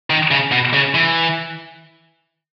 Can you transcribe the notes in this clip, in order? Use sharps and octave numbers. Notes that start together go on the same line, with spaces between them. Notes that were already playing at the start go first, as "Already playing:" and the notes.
D#3
C#3
B2
C#3
E3